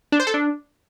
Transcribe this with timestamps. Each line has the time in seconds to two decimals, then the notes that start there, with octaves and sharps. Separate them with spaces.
0.12 D4
0.20 C5
0.27 A4
0.34 D4